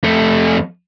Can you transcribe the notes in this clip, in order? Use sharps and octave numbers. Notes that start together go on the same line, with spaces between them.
F2 A3